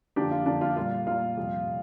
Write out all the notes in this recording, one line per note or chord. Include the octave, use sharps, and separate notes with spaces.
F2 D3 A#3 D4 G4
F4
F2 D3 A#3 D4
F4
A#2 G3 A#3 F4
A#2 G3 A#3 F4
F2 C3 G3 A#3
C3